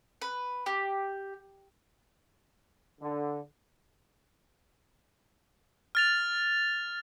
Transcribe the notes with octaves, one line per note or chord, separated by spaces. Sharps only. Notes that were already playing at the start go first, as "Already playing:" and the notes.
B4
G4
D3
F6 A6 F7